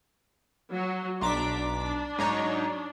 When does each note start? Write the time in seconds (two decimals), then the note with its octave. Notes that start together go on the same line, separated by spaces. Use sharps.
0.73 F#3
1.21 B1 D4 A#5 C6 D6 B6
1.75 D4
2.18 G#2 F#3 D#4 C#5 A#5